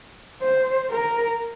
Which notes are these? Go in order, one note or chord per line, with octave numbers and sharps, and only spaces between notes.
C5
A#4